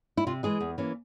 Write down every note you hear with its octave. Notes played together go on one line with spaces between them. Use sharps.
E4
C3 F4
E3 G#3 G#4
E2
E3 A#3 C#4